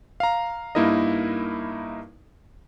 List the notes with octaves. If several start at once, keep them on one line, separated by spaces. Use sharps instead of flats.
F5 A#5
G2 A#3 D#4 E4 A#4 D#5